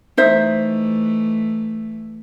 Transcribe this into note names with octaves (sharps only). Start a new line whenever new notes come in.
E3 A3 D#4 C5 E5